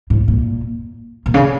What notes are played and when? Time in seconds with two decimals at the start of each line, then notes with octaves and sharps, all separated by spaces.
0.10 A2
0.28 A#2
1.26 A#2
1.34 C#3